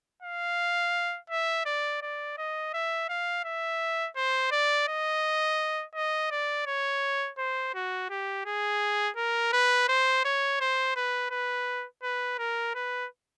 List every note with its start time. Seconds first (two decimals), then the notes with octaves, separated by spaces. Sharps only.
0.23 F5
1.30 E5
1.66 D5
2.02 D5
2.38 D#5
2.74 E5
3.09 F5
3.45 E5
4.16 C5
4.51 D5
4.88 D#5
5.95 D#5
6.31 D5
6.67 C#5
7.38 C5
7.75 F#4
8.10 G4
8.46 G#4
9.17 A#4
9.53 B4
9.89 C5
10.25 C#5
10.61 C5
10.96 B4
11.31 B4
12.03 B4
12.39 A#4
12.75 B4